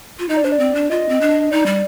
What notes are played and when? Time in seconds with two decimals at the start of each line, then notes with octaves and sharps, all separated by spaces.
0.19 F4
0.29 D#4 D#5
0.37 D5
0.44 D4 C5
0.52 D5
0.59 C4
0.75 D4
0.90 F4 D#5
1.09 C4
1.21 D4
1.41 D#5
1.51 D#4 D5
1.66 G3